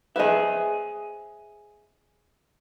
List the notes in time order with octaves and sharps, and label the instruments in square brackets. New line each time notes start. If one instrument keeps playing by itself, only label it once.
[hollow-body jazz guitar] G#4 E5 [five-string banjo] B4 C5 D#5